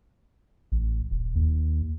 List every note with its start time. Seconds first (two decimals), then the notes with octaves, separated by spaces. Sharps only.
0.72 A1
1.11 D#1
1.35 D#2